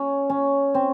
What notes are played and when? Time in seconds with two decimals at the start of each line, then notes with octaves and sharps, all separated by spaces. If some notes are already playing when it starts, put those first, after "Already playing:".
Already playing: C#4
0.30 C#4
0.74 C4